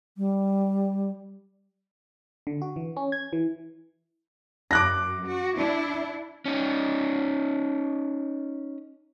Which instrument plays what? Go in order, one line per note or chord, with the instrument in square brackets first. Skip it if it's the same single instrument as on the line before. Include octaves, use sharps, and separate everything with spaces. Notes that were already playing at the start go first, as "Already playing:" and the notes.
[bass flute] G3
[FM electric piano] D3
F#4
E3
C#4
G#6
E3
[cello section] F#2 [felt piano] D6 F#6 A#6
[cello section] F#4
D4 E4
[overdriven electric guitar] C#4 D#4